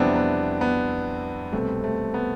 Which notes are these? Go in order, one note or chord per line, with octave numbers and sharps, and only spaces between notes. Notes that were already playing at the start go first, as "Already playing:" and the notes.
Already playing: F2 C3 E3 G3 B3 C4 D4 E4
B3
B3
C2 B2 G3 A3 C4
A3 C4
B3